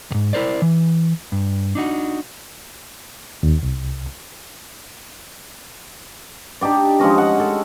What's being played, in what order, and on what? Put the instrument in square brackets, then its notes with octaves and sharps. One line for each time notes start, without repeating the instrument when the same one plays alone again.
[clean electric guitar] D#2 G#2
E4 A#4 C5 D5
E3
G2
D4 D#4 F#4
[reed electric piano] D#2
C2
[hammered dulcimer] D4 D#4 G4 D5
F3 G#3 C#4 D#5
F#5
G#4 A4